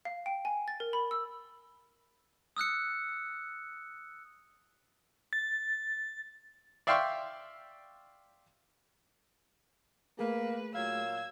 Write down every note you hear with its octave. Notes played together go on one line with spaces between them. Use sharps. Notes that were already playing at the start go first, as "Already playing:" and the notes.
F5
G5
G#5
A6
A#4
B5
E6
D#6 E6 F#6 C#7
A6
D5 E5 F5 G5 C6 C#6
A3 A#3 G#4 B4
A#2 F#3 F5 E6 G#6